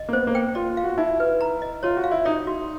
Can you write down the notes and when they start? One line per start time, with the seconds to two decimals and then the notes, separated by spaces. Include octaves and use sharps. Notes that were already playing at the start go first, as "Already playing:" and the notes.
Already playing: D#5
0.09 A#3
0.13 B3 C5
0.27 A#3
0.35 G5
0.55 F4 D5
0.70 F4
0.77 F5
0.84 F#4
0.98 D#4 E4
1.20 B4
1.41 A#5
1.62 D#5
1.83 F4 C#5
1.97 F#4
2.04 F5
2.11 E4
2.25 D#4 D5
2.47 F#4